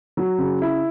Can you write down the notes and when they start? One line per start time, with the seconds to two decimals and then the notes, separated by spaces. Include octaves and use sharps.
0.17 F#3
0.38 C#3
0.62 E4